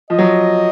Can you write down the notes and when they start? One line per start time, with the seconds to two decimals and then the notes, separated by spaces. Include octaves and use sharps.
0.10 F3 D#5
0.19 F#3